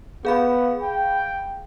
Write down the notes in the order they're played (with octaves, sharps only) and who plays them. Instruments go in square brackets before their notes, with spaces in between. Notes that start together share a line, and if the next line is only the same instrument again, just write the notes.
[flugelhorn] B3 [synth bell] G#4 F5 B5
[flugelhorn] G5